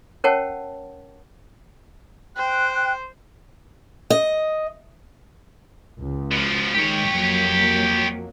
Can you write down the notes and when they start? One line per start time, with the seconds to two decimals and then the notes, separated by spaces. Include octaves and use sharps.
0.24 C#4 A#4 C#5 F#5 G5 A5
2.36 C5 G5 F#6
4.10 D#5
6.00 C#2
6.31 B2 F3
6.75 D#3 G#3 G4 C#5
7.08 F2 F#3 A#3